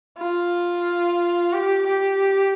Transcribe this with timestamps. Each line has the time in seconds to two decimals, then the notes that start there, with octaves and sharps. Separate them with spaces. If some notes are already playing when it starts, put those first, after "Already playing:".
0.18 F4
1.53 G4
1.87 G4